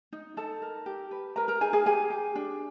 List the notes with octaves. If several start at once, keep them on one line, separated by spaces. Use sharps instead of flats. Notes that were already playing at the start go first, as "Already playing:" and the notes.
D#4
D#4 A4 A5
A#4
G4
B4
A#4 B4 A#5
A#4 A#5
D#4 G#4 G#5
G#4 G#5
G4 G#4 G#5
G4
D4